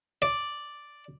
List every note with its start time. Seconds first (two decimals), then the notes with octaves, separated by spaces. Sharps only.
0.22 D5